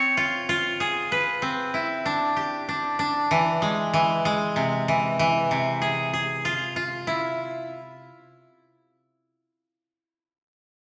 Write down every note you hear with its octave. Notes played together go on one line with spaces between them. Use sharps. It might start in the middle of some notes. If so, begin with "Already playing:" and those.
Already playing: C4 C#5
F4
F4
G#4
B4
C4
E4
D4
G4
D4
D4
E3
G#3
E3
G#3
C3
E3
E3
C3
G#4
G#4
F4
F4
E4